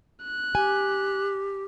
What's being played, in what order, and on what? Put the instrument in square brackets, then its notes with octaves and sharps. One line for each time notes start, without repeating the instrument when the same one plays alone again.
[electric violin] F#6
[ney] G4 [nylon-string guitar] G#5